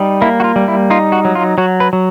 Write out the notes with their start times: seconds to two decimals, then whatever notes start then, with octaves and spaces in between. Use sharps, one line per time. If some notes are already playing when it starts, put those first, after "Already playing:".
Already playing: G3 D#4
0.22 A#3 E4
0.40 F#4
0.44 F4
0.56 G3
0.68 E4
0.90 D#4 F4
1.12 F#4
1.25 F#3
1.35 F4
1.58 F#3 F#4
1.80 B4
1.93 F#3